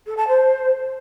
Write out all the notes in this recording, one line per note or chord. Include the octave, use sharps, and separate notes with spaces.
A4
A5
C5